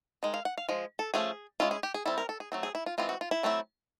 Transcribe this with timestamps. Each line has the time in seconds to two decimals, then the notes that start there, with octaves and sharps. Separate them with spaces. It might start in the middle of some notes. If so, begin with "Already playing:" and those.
0.23 D#3 G#3
0.34 F5
0.45 F#5
0.58 F5
0.69 F3 G#3
0.99 A4
1.14 F3 A3 C#4 G#4
1.60 G#3 C#4 E4 F4
1.71 G#4
1.83 G4
1.94 G#4
2.06 G3 C4 E4 A4
2.18 A#4
2.29 A4
2.40 G#4
2.52 F#3 A3 C4
2.63 G#4
2.75 E4
2.86 F4
2.98 E3 G#3 C4 F4
3.09 F#4
3.21 F4
3.31 E4
3.43 F#3 A3 C4 E4